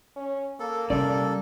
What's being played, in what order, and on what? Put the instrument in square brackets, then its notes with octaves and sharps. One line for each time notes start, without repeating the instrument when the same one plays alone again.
[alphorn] C#4
[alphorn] A#3 [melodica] A4
[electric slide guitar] C3 D5 [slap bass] G3 C#4 [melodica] A4